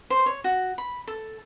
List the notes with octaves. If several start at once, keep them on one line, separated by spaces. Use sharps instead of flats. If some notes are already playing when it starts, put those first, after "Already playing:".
C5
C#5
F#4
B5
A4